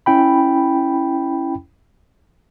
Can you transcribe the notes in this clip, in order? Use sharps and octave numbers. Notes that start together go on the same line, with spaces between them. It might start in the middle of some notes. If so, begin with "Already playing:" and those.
C#4 E4 G5 B5